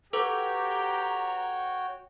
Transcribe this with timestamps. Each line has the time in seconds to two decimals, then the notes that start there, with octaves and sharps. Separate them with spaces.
0.13 F#4 G4 A4 B4 C#5 G5 A#5 D6